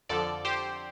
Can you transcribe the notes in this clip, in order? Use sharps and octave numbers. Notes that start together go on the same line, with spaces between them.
F2 D3 F3 A4 D5
G4 C5